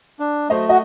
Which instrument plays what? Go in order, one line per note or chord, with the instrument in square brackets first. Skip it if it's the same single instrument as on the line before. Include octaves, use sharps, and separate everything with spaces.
[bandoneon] D4
[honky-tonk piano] F#3 C5 D#5 [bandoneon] A3
[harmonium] F#4 [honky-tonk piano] D#5